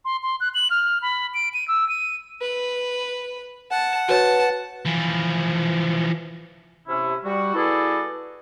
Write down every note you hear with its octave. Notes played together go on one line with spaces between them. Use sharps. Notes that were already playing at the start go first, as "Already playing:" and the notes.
C6
C6
F#6
F#7
F6
B5
D7
D#7
E6
D#7
B4
F#5 A5
F#4 B4 C#5 A5
E3 F3
C3 C#4 E4
G3 F#4
B3 E4 F#4 G#4 A4 D5